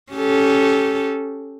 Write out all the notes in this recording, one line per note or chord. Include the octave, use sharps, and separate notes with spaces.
C#4 G4 A4